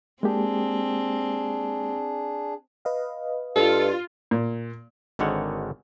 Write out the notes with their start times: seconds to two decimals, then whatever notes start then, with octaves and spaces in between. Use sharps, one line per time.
0.23 G#3 A#3 C4 D4 G4 G#4
2.85 B4 D#5 F5
3.56 G2 F4 A4
4.31 A#2
5.19 G#1 G#2 D3 D#3 C#5 F#5